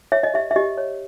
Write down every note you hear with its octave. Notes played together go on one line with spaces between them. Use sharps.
C#5 E5
D#5
G4 E5
E5
G4 D#5
C#5